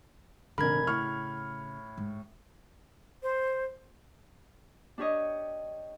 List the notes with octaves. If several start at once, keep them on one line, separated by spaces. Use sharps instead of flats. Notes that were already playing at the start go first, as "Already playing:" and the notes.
F1 A#2 D3 A#4 B5 G#6
A2 C#3 C#6 F6
G#2
C5
D4 G4 C#5 D#5